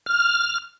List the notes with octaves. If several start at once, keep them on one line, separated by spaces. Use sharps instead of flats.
F6